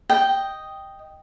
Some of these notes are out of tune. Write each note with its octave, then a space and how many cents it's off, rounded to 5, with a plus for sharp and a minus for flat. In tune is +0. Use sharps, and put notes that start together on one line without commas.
D#5 +0 G5 +0